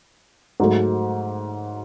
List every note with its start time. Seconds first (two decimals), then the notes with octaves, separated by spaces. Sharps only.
0.60 G#2 F#3 A3